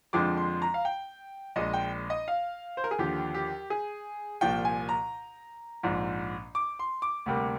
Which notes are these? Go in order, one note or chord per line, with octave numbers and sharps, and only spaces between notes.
F2 D3 F3 G#3 D6
C6
A#5
F5
G5
A#1 A#2 G#3 D#5
G5
D#5
F5
C5
A#4
G#4
D#2 D3 F3 G4
G4
G#4
C2 A#2 F3 G5
G#5
A#5
A#1 G#2 F3
D6
C6
D6
D2 C3 G3 A#3